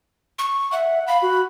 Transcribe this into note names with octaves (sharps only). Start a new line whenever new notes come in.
C#6
E5 F#5
F5 B5
F#4